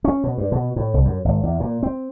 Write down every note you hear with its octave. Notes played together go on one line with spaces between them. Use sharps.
C#4
B2
G2
B2
A2
C2
F#2
G#1
E2
A#2
C4